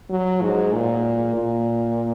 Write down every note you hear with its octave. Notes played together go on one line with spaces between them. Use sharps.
F#3
G#2
A#2
A#2